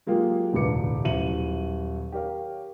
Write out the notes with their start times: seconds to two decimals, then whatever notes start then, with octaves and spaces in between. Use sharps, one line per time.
0.07 F#3 G#3 A#3 F4 G4
0.53 E1 D2 A2 B4 D6 C#7
1.04 D#1 F#3 E4 D#7 F#7
2.12 G4 A#4 C#5 F5